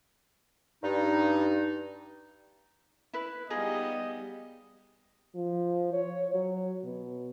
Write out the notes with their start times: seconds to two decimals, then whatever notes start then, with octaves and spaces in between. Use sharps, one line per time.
0.83 G2 D#4
3.13 E4 B4
3.50 G3 B3 D#4 F4 G#4 D#5
5.35 F3
5.93 C#5
6.34 F#3
6.84 B2